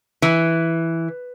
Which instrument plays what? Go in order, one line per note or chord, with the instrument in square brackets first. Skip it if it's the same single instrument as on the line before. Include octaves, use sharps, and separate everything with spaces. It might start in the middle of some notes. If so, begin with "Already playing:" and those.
[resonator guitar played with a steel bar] E3